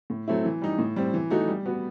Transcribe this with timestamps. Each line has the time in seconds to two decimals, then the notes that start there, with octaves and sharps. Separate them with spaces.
0.10 A2
0.28 F#3 A3 C4 E4
0.45 E3
0.61 G3 D#4
0.79 A2
0.96 G3 C4
1.14 E3
1.30 A3 D#4 F#4
1.48 G3
1.66 B3 F#4